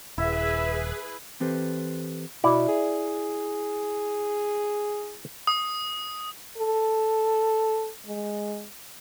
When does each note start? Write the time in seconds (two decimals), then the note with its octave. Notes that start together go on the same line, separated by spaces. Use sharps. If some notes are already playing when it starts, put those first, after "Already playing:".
0.18 D#1 E4 G#4 B4 E5
1.40 E3 C4 G4 A4 B4 C5
2.44 B2 E4 D5
2.69 G#4
5.47 D#6
6.57 A4
8.07 G#3